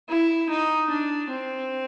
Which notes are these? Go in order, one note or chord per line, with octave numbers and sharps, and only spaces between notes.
E4
D#4
D4
C4